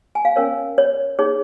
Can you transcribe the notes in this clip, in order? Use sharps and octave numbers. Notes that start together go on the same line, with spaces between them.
G#5
F5
C#4 A#4 C#5
C#5
D#4 G#4 C#5